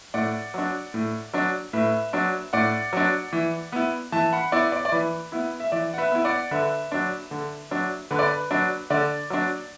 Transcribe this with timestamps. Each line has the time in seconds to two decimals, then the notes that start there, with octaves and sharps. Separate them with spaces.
0.14 A2 D5 F#5
0.54 F#3 D4
0.94 A2
1.34 F#3 D4
1.73 A2 B4 E5
2.13 F#3 D4
2.53 A2 D5 F#5
2.93 F#3 D4
3.33 E3
3.72 B3 E4
4.12 E3 E5 A5
4.33 F#5 B5
4.52 B3 E4 D5 F#5
4.72 D5
4.85 D5
4.92 E3 B4
5.32 B3 E4
5.60 E5
5.72 E3 D5
5.94 F#5
5.98 B4 E5
6.12 B3 E4
6.25 D5 F#5
6.51 D3 B4 E5
6.92 F#3 D4
7.31 D3
7.71 F#3 D4
8.11 D3 B4
8.19 D5
8.27 B4
8.51 F#3 D4
8.90 D3 D5
9.30 F#3 D4